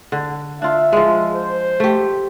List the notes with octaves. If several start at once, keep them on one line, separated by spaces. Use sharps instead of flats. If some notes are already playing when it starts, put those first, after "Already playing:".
D3
D4 F4 E5
F3 G#3
C5
A3 G4